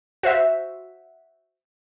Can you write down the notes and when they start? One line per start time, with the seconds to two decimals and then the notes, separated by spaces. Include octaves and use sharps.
0.23 F#4 C5 E5